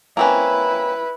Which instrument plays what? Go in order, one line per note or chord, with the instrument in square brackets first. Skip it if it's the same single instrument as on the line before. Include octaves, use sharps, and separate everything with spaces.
[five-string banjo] A#3 C4 C#4 [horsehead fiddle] E4 B4